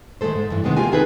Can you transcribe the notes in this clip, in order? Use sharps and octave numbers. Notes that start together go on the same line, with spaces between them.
D#3 G#3 A3 A4 C5
G#2
G2 E3
C3 D#3 E3 G#3 B3 C4
A3 A#3 F4 G4 A#4 G#5
C4 D#4 G#4 A4 B4